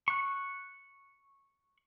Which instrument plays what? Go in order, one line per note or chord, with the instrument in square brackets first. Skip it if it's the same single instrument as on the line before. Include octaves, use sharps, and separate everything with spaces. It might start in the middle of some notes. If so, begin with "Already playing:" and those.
[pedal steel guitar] C#6 F#6